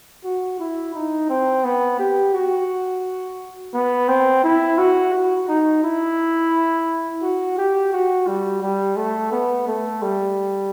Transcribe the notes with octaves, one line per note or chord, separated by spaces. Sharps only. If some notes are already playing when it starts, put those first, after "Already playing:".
F#4
E4
D#4
C4
B3
G4
F#4
B3
C4
E4
F#4
F#4
D#4
E4
F#4
G4
F#4
G3
G3
A3
B3
A3
G3